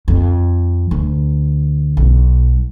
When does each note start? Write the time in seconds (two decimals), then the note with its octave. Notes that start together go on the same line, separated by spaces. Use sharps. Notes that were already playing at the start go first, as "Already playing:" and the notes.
0.08 F2
0.91 D2
1.97 B1